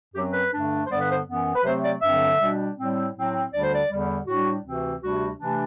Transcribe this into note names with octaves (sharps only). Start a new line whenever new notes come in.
F#2 F#3 C4 G4
B4
G2 D3 A3 D4
C5
G2 D3 G3 B3 D5
B4
C5
F#2 E3 B3
B4
C3 F#3 A3 C4 C5
D5
G2 D3 F#3 C4 E5
B2 G3 D4
A2 G3 C4
A2 F#3 C4
D2 D3 G3 D4 D5
C5
D5
E2 D3 G3
A2 G3 D4 F#4
D2 C3 E3 A3 C4
D2 C3 G3 D4 F#4
C3 E3 A3 D4